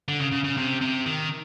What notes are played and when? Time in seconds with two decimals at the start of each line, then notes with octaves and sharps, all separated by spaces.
0.08 D3
0.20 C#3
0.32 C#3
0.44 C#3
0.57 C3
0.81 C3
1.06 D#3